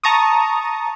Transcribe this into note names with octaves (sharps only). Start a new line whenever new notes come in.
A5 A#5 C#6 D#6